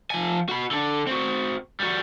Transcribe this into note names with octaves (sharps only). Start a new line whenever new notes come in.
F3 G#5
F#4 B5
D3 D4
C4 F#4
G3 F#4